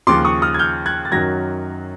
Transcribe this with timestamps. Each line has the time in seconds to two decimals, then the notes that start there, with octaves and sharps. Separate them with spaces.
0.07 D#2 C#3 F3 C6 D6
0.25 C#6 D#6
0.42 D#6 F6
0.54 G#6
0.59 F6 G6
0.86 F#6 G#6
1.05 A6
1.12 F#2 D#3 F#3 G#6 A#6